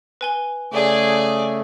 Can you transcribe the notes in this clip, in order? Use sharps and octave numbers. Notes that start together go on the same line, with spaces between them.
B4 G#5 G7
C#3 A3 G#4 D5